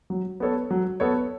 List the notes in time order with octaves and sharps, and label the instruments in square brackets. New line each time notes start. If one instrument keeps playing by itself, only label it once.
[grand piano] F#3
B3 A4 C#5
F#3
B3 A4 C#5